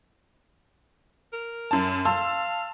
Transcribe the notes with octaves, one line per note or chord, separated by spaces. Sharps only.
A#4
F#2 A5
F5 A5 C6 E6